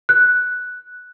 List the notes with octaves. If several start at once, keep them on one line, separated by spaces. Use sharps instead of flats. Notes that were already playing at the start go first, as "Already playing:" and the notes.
F#6